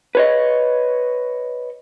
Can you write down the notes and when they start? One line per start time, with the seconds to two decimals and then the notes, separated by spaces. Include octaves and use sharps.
0.15 B4 C#5 D#5